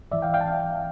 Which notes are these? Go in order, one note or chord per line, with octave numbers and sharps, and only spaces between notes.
G#2 E3 D5 E5
F5 G5
F5 G5
A5